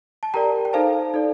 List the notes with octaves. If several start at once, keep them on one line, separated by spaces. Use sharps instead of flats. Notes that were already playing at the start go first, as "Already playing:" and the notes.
A5
G4 A#4 D5 G5 A#5
G5
D#4 A4 C5 F5 A5
D#4 A4 D5